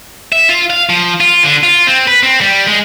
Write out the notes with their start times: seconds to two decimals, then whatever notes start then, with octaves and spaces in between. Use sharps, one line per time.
0.32 E5
0.49 F4
0.70 F5
0.89 F3
1.20 F4
1.43 D3
1.63 F4
1.87 C4
2.08 B4
2.23 C4
2.41 G3
2.67 G#3